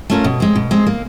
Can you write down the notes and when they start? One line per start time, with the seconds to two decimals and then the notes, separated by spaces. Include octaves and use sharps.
0.10 A3 C#4 F4 A#4
0.24 B2
0.40 G#3 C4
0.56 B2
0.71 G#3 C4
0.86 A#3